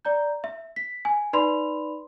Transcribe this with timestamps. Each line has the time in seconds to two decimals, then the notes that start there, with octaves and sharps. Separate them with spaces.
0.05 D5 A#5 G6
0.44 E5
0.76 B6
1.05 G#5
1.33 D#4 B4 D5 B5 C6 F7